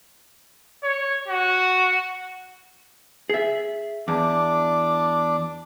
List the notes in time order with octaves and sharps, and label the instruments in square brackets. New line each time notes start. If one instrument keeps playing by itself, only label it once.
[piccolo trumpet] C#5
F#4
[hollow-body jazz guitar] G#4 E5
[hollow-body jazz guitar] E2 [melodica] D4 D6